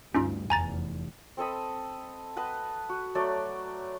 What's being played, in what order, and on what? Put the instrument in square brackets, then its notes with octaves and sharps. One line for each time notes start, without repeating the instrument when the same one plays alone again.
[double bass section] D2 G2 [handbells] C#4 D#4 F4
[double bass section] F1 E2 [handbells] G#5 A#5 A6
[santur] C4 A4 D#5 B5
B4 D#5 F#5 A5
F#4
F#3 A3 D5